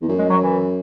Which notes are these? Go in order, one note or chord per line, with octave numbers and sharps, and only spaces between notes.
E2
F#2
G#3
F#3
E3